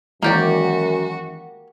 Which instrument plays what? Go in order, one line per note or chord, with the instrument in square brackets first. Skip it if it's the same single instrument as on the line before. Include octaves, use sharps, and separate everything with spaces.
[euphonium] F#2 [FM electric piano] D#3 E3 G#3 [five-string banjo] A#3 G4 D5 [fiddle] F#4